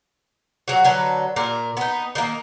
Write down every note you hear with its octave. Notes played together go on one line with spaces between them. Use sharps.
F#3 F#4
D3 F#3 B4
A#2 A#4
B3 D#4
D#3 A#3